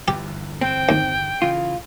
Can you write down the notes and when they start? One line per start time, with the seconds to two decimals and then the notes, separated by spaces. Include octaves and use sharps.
0.08 G1 E2 G4
0.61 C4 G5
0.89 D#2
1.42 C#3 E3 F4